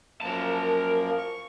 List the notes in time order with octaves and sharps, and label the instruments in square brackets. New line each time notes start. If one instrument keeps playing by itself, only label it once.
[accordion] F#2 F3 A#3 [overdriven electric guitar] A#4 A5
[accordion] C#6